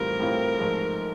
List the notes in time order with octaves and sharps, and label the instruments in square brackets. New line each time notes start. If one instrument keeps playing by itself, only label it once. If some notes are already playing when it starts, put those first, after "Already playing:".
Already playing: [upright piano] A2 E3 G3 C4 F4 [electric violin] A#4
[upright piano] A2 E3 G3 C4 F4
G#2 F3 A3